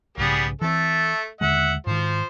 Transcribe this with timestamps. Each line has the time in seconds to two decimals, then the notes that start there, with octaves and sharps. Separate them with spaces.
0.18 B1 G#2 C#3 G3 B3 G#4
0.62 E3 A3 C4 A4
1.41 D#2 D3 G#3 E5 F#5
1.87 G#2 D#3 F3 C5